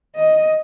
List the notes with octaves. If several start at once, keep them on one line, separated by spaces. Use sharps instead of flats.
D#5